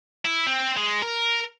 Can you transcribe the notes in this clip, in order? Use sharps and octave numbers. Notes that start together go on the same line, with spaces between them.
E4
C4
G#3
A#4